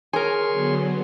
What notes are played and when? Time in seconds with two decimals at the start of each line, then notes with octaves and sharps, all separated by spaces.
0.13 G#4 A#4 C#5 G#5 C6
0.49 D3 F#3 B3